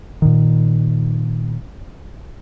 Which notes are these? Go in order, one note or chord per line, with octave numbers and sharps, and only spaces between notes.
A#2 D#3